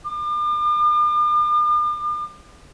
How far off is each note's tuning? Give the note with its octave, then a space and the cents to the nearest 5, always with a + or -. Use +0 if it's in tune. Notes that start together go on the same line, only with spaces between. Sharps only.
D6 +45